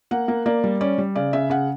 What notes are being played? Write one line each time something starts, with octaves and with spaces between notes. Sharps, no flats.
A#3 F#5
A#3
A#3 D5
G3
C#4 D5
G3
C#3 D5
C#3 E5
C#3 F#5